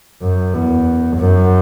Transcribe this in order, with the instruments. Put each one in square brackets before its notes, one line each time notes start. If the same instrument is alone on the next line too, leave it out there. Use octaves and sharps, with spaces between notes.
[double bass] F#2
E2
F#2